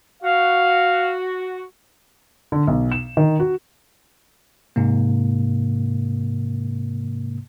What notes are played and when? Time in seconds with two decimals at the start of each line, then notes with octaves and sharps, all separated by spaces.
0.23 F#4 F5
2.52 D3
2.67 B1
2.92 E7
3.17 D#3
3.40 F#4
4.76 G#2 C3 A#3